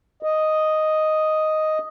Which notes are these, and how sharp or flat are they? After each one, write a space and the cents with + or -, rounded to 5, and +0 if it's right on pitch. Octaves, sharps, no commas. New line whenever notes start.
D#5 +0